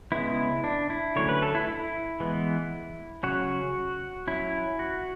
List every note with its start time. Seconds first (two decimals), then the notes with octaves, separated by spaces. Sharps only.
0.12 C#3 G#3 B3 E4
0.64 D4
0.90 E4
1.16 D3 F#3 A3 C#4 C#5
1.29 B4
1.42 A4
1.55 E4
1.68 E4
2.20 E3 G#3 B3
3.23 C#3 F#3 C#4 F#4
4.27 F#3 C#4 E4
4.79 F#4